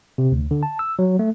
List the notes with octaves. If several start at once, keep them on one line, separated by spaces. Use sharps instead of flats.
C3
D2
D3
A5
E6
F#3
A3